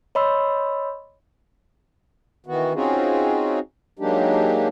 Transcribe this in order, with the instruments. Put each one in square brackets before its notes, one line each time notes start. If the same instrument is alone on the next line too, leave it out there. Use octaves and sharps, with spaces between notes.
[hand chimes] C#5 D#5 B5 C6 E6
[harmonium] D#3 E3 B3 F#4
C4 C#4 D#4 F4 F#4 G#4
F#3 G#3 A#3 D4 D#4 G4